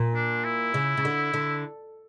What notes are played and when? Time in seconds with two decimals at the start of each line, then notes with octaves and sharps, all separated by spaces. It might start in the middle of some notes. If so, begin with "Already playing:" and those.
Already playing: A#2
0.15 D4
0.44 E4
0.74 C#3
0.97 C#3
1.05 D3
1.34 D3